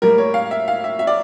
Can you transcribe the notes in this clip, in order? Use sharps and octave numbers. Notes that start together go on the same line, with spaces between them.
A2 G3 A#3 A#4
C#5
F5
E5
F5
E5
E5
D5